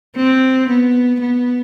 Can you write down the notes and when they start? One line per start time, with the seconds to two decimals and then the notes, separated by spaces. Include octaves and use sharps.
0.16 C4
0.68 B3
1.20 B3